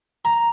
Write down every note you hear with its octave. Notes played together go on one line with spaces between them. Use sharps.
A#5